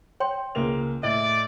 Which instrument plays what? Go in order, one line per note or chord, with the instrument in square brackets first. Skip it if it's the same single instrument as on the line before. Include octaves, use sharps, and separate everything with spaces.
[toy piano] C#5 G5 C6
[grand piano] C#2 A#3 F7
[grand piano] A2 [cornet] D5 [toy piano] D#5